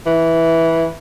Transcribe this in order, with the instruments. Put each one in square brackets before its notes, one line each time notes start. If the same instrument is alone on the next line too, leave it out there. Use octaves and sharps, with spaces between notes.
[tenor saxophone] E3